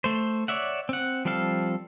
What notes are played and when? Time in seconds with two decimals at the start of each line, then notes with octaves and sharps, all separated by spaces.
0.04 A3 C5
0.48 C#5 D5 E5 F#5
0.89 C4 F#5
1.25 F3 G3 C4 A4 F5